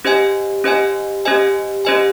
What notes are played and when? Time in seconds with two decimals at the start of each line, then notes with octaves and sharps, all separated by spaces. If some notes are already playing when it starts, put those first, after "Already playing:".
0.04 C#4 G4 C5 D#5 G#5
0.64 C#4 G4 C5 D#5 G#5
1.25 C#4 G4 C5 D#5 G#5
1.85 C#4 G4 C5 D#5 G#5